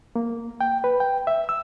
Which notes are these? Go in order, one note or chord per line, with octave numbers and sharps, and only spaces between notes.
A#3
G5
B4
G5
E5
E6